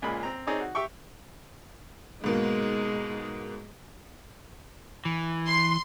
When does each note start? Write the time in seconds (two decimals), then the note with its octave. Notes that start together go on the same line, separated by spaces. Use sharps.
0.02 C#2 A#2 G#3 B5
0.23 C4 A#5
0.47 C4 D#4 G#4 C#5 D5
0.60 F#4
0.75 G4 E5 G5 C#6
2.24 G#2 B2 G#3 A#3
5.05 E3
5.45 C6